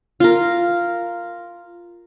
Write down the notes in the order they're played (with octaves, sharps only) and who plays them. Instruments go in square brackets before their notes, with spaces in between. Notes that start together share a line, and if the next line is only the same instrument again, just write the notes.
[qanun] F4 A#4